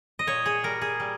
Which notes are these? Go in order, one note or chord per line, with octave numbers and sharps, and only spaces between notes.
D#5
A#2 C#5
G#4
G3 A#4
G#4
G3